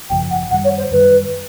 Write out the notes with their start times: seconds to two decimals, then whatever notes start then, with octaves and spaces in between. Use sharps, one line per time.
0.10 G#1 F#2 C#3 F3 G5
0.31 F#5
0.50 F#2 D#3 G3 F#5
0.64 C#5
0.78 C5
0.91 F#2 D#3 G3 B4